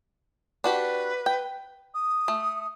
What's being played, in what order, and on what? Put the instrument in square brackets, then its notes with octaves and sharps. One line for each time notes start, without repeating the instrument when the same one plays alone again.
[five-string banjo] D4 F#4 G4 [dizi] B4
[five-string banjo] G5
[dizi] D#6
[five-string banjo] A3